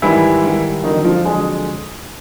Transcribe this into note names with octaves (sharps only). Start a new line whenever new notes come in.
G#2 D#3 E3 G3 E4
G#2 D#3 G3
F2 D3 D#3 F#3 D#4
F3 F4
F2 D3 F#3 G#3 G#4